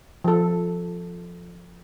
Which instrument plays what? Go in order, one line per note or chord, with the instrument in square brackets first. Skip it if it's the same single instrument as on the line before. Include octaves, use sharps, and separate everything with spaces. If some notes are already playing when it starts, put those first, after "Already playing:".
[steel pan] F3 A4